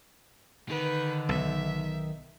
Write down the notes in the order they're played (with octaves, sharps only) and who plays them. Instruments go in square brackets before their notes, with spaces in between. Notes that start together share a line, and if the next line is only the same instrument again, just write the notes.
[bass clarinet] D3 [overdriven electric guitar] D#3 [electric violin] B4
[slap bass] B1 [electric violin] E5